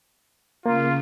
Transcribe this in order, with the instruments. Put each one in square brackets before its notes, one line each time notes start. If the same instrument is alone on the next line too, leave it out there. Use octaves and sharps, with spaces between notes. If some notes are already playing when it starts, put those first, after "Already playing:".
[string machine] C#3 [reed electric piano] A#3 [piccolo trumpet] F4